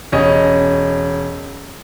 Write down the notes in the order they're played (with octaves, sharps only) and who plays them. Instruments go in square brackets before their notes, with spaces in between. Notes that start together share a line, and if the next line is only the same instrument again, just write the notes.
[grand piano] E1 C#4 D#5